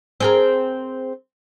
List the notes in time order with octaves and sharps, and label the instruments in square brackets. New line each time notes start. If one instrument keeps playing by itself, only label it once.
[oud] C4 G#4 A#4